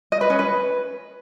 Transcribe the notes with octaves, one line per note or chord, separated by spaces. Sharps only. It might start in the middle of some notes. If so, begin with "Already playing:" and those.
D#5
B4
C#4
B4